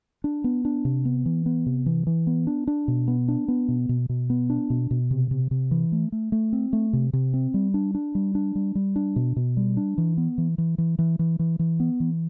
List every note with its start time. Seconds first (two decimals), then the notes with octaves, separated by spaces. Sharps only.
0.24 D4
0.44 B3
0.65 D4
0.85 C3
1.05 B3
1.26 E3
1.46 B3
1.66 C3
1.86 E3
2.07 E3
2.27 B3
2.47 D4
2.67 D4
2.88 B2
3.08 B3
3.28 D4
3.48 B3
3.68 B2
3.89 B2
4.09 B2
4.30 B3
4.50 D4
4.70 B2
4.91 B2
5.11 C3
5.31 C3
5.51 C3
5.71 E3
5.92 A3
6.12 A3
6.32 A3
6.53 C4
6.73 A3
6.93 C3
7.13 C3
7.34 C4
7.54 G3
7.74 D4
7.95 D4
8.15 G3
8.35 D4
8.55 G3
8.75 G3
8.96 D4
9.16 B2
9.36 B2
9.57 G3
9.77 D4
9.98 E3
10.17 B3
10.38 E3
10.58 E3
10.78 E3
10.99 E3
11.19 E3
11.39 E3
11.59 E3
11.80 B3
12.00 E3